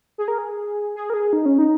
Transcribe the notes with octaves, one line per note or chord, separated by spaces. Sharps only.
G#4
A#4
G#4
G#4
A#4
G#4
D#4
C#4
D#4